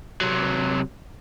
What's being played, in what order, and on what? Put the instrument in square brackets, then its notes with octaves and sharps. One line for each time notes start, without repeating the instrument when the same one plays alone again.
[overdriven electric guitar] C3 F#3